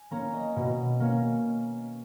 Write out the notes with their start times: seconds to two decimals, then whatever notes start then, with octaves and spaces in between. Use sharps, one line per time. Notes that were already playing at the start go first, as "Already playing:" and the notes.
Already playing: G#5
0.11 A#3 C#4 A#5
0.33 D#5
0.56 B2
1.00 A#3 C#4